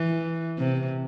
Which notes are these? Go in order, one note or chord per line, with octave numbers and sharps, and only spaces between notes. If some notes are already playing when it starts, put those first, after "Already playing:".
Already playing: E3
C3